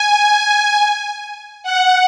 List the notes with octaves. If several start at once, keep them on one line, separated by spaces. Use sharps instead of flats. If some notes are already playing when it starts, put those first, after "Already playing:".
Already playing: G#5
F#5